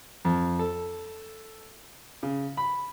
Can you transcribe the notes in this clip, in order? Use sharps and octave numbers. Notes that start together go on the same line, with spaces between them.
F2
A4
C#3
B5